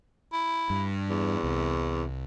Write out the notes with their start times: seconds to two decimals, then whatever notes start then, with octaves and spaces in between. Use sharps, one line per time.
0.33 E4
0.70 G2
1.10 E2
1.43 C2